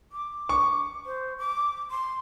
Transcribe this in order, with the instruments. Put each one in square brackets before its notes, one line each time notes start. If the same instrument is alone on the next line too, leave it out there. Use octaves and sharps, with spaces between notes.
[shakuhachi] D6
[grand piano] C#6
[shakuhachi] C5
D6
C6